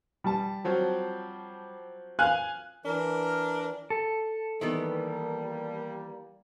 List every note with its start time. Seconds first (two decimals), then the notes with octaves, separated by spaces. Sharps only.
0.24 G3 A5
0.65 F3 F#3 C4
2.19 F5 G#5 F#6
2.85 E3 D4 A#4
3.90 A4
4.61 D#3 E3 G3 A#3 B3